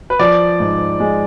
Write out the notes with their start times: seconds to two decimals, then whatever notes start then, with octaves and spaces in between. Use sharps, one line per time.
0.10 B4
0.19 F3 D5
0.60 G#2
1.00 G#3